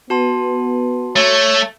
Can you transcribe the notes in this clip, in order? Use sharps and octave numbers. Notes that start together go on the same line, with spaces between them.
B3 F#4 A5 C6
A3 C#5